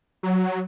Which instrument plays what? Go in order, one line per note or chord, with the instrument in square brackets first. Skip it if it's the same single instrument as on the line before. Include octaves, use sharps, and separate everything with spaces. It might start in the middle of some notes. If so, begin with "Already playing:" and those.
[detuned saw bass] F#3